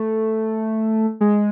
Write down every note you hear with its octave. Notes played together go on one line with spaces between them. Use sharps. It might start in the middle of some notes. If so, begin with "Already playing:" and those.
Already playing: A3
G#3